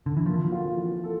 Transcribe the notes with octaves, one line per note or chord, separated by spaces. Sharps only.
D3
E3
F3 A#3
F4
E3
A4